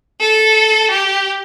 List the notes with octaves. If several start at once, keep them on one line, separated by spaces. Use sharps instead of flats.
A4
G4